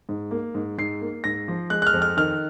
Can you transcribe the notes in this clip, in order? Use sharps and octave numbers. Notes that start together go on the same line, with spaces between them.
G#2
A#3
G#2
G#2 C7
A#3
G#2 A#6
F3
G#3 F#6
F#6
F6
F2
F6
D#3 F6